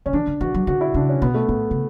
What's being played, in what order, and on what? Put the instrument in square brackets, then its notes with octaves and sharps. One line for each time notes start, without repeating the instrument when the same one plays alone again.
[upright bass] D3 [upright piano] C#4
[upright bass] E3 [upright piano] D4
[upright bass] D3
[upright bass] E3 [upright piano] F#4
[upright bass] F#3
[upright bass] D3 [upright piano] F#4
[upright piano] E4
[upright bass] C#3 [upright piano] D4
[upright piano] C#4
[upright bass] B2 [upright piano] B3
[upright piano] A3
[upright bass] A2 [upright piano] B3
[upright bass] C#3